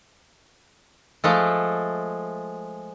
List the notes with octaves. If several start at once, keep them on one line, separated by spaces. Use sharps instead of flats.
F3 G#3 A3